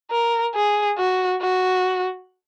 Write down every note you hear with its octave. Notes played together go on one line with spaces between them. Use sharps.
A#4
G#4
F#4
F#4